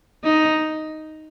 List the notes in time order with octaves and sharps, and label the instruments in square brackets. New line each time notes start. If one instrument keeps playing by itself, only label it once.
[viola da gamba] D#4